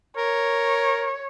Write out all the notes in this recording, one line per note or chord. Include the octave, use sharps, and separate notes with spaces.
A#4 C#5